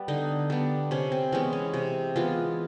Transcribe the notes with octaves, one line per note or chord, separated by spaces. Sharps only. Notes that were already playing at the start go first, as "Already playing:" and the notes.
Already playing: G3 B3
D3 D#4
G3 B3 D4
C3 C#4
C4
E3 G#3 B3 C#4
C#4
C3
E3 G#3 B3 F4